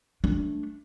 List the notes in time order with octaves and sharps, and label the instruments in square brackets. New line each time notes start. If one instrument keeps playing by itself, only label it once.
[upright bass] A3 D4